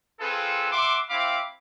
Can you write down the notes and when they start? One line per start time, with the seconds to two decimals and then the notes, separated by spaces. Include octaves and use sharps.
0.20 C4 F4 G#4 A4 B4
0.72 E5 F#5 C6 D6
1.10 C4 E4 F5 B5 D6